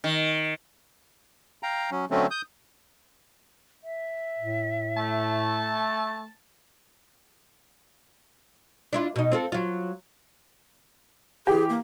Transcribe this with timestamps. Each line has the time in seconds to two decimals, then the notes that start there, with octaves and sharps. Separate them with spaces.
0.04 D#3
1.63 F5 G5 A#5
1.91 F#3 C#4
2.11 D3 F#3 A3 C4 C#4
2.31 D#6 G6
3.84 E5
4.39 A2
4.97 A3 A5
8.93 D4 E4 F4
9.16 B2 D#4
9.32 C4 F4 A4
9.52 F#3 F4
11.47 E3 G4 G#4
11.70 A#3